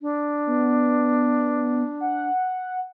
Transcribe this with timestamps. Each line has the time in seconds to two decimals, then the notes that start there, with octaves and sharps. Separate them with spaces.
0.01 D4
0.47 B3
2.01 F#5